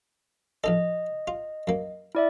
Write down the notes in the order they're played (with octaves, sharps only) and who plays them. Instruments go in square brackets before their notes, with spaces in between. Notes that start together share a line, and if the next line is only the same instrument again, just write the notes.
[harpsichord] A#1 D#4 A4 [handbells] D#5
[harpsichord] F4
F#2 A#3
[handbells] E4 D5 E5